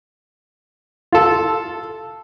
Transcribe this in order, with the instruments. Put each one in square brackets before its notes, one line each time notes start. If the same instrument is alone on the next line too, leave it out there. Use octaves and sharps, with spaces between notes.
[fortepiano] F4 A4